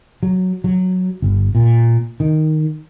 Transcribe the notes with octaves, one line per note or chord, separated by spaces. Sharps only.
F#3
F#3
G1
A#2
D#3